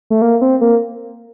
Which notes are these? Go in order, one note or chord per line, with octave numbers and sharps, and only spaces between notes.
A3
A#3
C4
A#3